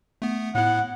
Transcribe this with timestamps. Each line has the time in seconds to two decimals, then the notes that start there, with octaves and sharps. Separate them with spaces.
0.22 A3 B3
0.55 A2 B3 E4 F#5